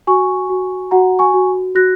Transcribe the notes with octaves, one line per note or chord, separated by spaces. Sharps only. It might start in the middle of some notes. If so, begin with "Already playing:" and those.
F#4 G#5 C#6
F#4
F#4 F#5 A#5
G#5 C#6
F#4
F#4 F#6 A#6